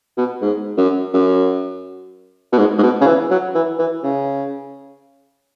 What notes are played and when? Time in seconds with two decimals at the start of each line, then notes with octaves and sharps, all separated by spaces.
0.17 B2
0.41 G#2
0.77 F#2
1.13 F#2
2.52 B2
2.58 G#2
2.78 G#2
2.83 B2
3.01 C#3
3.07 E3
3.30 F#3
3.55 E3
3.79 E3
4.03 C#3